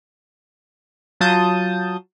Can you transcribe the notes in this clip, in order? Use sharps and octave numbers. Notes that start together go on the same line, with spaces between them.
F#3 F4 A5 D#6 G6